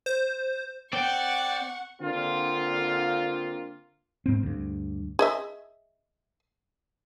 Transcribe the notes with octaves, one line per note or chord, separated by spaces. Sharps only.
C5
C4 D5 F#5 G5 C#6
D3 A#3 C4 F4
G#2 C4
D2 G2
G#4 D#5 E5